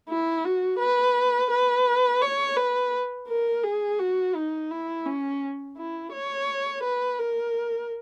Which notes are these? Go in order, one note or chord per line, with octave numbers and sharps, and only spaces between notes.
E4
F#4
B4
B4
C#5
B4
A#4
G#4
F#4
D#4
E4
C#4
E4
C#5
B4
A#4